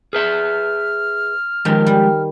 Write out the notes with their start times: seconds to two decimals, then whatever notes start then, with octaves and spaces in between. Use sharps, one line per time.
0.13 G#4 B4 E5 F6
1.65 D#3 F3 G#3 G4
1.87 G3